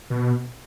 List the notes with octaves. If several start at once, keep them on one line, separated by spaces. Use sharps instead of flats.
B2